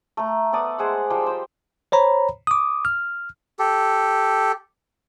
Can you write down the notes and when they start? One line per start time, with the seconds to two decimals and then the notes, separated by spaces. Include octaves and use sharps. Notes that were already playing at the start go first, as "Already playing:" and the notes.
0.17 A3 A#5
0.53 B3 A4 D5 D#6
0.79 G#3 G#4 C5 F#5
1.10 F3 G3 G5
1.26 G4 C5
1.92 C5 C#5 A#5 B5
2.47 D6 D#6
2.85 F6
3.59 G4 A4